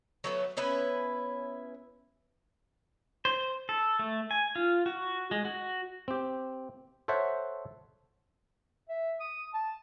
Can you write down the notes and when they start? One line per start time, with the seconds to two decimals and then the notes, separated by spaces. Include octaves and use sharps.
0.24 F#3 A3 B3
0.57 B3 C#4 E4 B4
3.25 C5
3.69 A4
3.99 A3
4.31 G#5
4.56 F4
4.86 F#4
5.31 G#3
5.45 F#4
6.08 C4 G4
7.08 A4 C5 C#5 E5 F#5
8.89 E5
9.20 D#6
9.54 A5